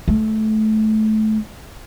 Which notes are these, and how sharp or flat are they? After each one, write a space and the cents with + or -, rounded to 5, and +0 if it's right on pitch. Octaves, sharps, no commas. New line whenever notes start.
A3 -20